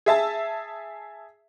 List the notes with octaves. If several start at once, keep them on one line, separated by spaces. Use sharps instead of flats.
G#4 E5 A5